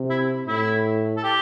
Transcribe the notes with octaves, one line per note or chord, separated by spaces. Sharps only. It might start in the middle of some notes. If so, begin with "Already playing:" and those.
Already playing: C3
E4
A2 E4
A4
G4